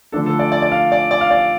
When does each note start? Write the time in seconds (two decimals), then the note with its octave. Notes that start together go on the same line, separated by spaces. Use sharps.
0.12 D3 F3 A3 D4 A4
0.26 A4
0.39 D5
0.52 D5
0.62 D5
0.72 F5
0.92 D5
1.11 D5
1.21 F5
1.31 D5